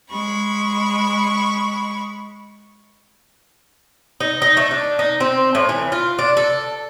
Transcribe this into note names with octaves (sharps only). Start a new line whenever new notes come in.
G#3 B5 C#6
D#4
D#4
A3
D4
D#4
C4
A2
E3
F4
D4
A4